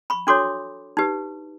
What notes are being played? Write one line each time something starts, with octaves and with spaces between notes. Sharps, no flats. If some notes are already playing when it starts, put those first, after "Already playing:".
B5 C#6
D4 F#4 A4 C#5 C6 D6
D#4 G4 B4